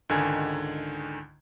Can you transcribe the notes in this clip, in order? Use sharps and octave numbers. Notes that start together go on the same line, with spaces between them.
C#2 G#2 D3 D#3 G#5 G#6